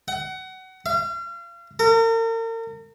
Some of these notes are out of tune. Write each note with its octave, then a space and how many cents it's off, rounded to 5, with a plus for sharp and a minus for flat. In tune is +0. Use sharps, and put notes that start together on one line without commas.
F#5 +25
F5 -35
A#4 -40